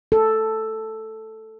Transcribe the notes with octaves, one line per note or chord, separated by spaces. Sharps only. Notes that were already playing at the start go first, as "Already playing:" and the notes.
A4